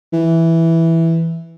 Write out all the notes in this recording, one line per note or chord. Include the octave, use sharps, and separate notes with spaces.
E3